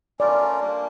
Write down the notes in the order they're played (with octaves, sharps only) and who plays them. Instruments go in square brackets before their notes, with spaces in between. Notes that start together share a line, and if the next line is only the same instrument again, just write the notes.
[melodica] A3 C#4 F4 A#4 [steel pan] D5
[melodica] G3 A#3 D4